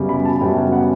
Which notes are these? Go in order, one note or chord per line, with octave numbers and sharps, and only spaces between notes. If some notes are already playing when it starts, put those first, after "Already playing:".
Already playing: F#2 C#3 G3 B3
B5
A5
F#2 C#3 G3 B3 G5
G5
F#5